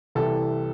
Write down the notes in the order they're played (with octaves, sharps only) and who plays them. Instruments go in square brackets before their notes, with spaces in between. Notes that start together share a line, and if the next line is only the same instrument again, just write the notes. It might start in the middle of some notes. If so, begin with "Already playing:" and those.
[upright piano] C2 C3 E3 A4